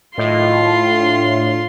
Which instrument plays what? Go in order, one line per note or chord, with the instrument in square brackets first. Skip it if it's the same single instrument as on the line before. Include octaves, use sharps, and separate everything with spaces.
[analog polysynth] A2 [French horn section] D#3 F#3 D#5 [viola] F4 C6
[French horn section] D4